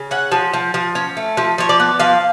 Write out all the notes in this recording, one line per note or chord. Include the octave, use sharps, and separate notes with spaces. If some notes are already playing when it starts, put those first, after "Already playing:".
Already playing: C#3
C#4 F#5
F3
F3
F3
C#4
A3
F3
F3 C#5
D5
B3
F3 F5